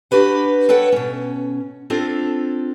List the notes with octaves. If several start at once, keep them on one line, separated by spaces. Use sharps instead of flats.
D4 F#4 G4 B4 F#5
A4 B4 C#5 F#5 G5
B2 C#4
C4 D4 F4 A4